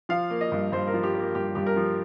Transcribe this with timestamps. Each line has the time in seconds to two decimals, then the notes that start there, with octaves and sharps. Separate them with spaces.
0.09 F3 F5
0.31 A#3
0.41 D#5
0.52 G2
0.72 G2 C5
0.87 A#4
0.94 F3
1.03 G4
1.15 A#3 A#4
1.35 G2 G4
1.55 G2 G4
1.66 A#4
1.76 F3